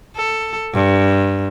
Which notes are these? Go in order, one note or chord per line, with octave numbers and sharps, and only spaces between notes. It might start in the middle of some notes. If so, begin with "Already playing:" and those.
A4
G2